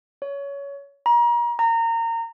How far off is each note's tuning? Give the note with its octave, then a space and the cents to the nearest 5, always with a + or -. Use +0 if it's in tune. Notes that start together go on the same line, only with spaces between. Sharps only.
C#5 +20
A#5 +35
A#5 -25